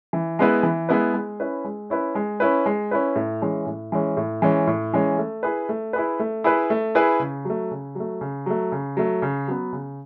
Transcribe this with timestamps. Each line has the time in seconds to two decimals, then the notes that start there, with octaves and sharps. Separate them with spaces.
0.13 E3
0.39 G#3 B3 E4 B4
0.63 E3
0.89 G#3 B3 E4 B4
1.14 G#3
1.40 C#4 E4 B4
1.65 G#3
1.90 C#4 E4 B4
2.15 G#3
2.40 C#4 E4 B4
2.66 G#3
2.91 C#4 E4 B4
3.16 A2
3.42 E3 G#3 C#4
3.66 A2
3.92 E3 G#3 C#4
4.17 A2
4.42 E3 G#3 C#4
4.67 A2
4.93 E3 G#3 C#4
5.18 A3
5.43 E4 G#4 B4
5.69 A3
5.93 E4 G#4 B4
6.20 A3
6.44 E4 G#4 B4
6.70 A3
6.95 E4 G#4 B4
7.20 C#3
7.45 F#3 A3
7.71 C#3
7.95 F#3 A3
8.21 C#3
8.46 F#3 A3
8.72 C#3
8.97 F#3 A3
9.22 C#3
9.48 F#3 B3
9.73 C#3